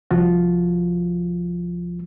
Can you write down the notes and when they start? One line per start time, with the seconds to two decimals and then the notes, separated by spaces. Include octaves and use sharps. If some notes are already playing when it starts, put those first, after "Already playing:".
0.11 C2 F3 F4 F#4